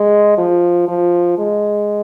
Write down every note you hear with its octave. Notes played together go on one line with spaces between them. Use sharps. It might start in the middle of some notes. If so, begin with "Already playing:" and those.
Already playing: G#3
F3
F3
G#3